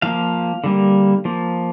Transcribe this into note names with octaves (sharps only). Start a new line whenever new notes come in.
F3 A#3 F5
D3 G3 A#3
F3 A#3